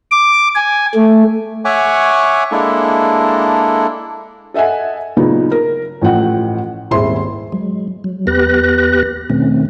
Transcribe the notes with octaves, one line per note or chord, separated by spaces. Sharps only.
D6
G#5
A3
C#5 E5 F#5 G#5 C#6 D6
G#3 A#3 D4 E4 A4
A4 D#5 E5 F#5 G#5
A#2 C#3 F#3 B3 D#4
A#4
A1 A2 F3 F#5 G5
D#1 G#1 E4 G#4 C6
F#3 G#3
F#3
E2 B3 G4 B4 F#6 A#6
B2 D#3 A3 C4 C#4